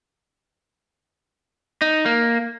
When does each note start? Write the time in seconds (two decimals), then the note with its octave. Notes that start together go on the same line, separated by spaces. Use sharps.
1.82 D#4
2.06 A#3